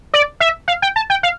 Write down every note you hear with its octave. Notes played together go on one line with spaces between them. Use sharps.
D5
E5
F5
G5
A5
G5
F5